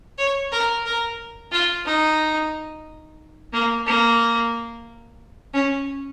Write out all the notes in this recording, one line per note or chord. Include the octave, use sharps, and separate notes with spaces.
C#5
A#4
A#4
F4
D#4
A#3
A#3
C#4